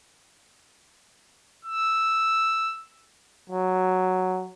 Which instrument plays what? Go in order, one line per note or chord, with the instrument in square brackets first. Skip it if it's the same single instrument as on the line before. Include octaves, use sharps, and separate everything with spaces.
[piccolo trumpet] E6
[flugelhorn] F#3